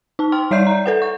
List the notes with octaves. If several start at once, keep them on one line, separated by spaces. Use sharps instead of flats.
D#4 A5
G5 C6 F6
G3 C#5 D5 E5 G6 C7
D5 A#5
A4 B4 F#5
C#6